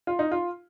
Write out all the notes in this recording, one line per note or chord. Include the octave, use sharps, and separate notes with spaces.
F4
D#4
F4